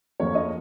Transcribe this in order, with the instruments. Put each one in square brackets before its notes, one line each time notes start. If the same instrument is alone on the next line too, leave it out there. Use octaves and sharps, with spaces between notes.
[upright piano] F2 F3 A#3 C#5
D#5